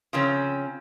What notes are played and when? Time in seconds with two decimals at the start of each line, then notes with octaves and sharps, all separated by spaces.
0.13 C#3 F3 C4 C#4